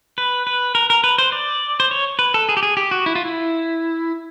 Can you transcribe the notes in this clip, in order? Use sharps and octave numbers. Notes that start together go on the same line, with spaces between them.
B4
B4
A#4
A#4
B4
C5
D5
C5
C#5
B4
A4
G#4
G4
G#4
G4
F#4
E4
F4
E4